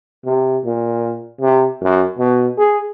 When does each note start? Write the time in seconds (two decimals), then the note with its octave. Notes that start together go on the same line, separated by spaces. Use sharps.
0.25 C3
0.65 A#2
1.40 C3
1.82 F#2
2.18 B2
2.58 G#4